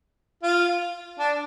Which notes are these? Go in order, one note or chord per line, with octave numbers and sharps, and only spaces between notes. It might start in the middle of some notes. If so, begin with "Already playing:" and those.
F4
D4